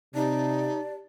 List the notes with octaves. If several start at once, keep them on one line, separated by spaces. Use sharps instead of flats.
C3 D#4 G4 D5 A5